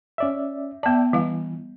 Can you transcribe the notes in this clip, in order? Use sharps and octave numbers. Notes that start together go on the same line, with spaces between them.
C#4 D5 E5
B3 D5 E5 G5 A5
E3 G3 F5